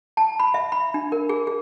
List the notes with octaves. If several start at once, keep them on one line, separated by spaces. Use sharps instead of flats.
A5
B5
E5
B5
D4
A#4
G#4
G#4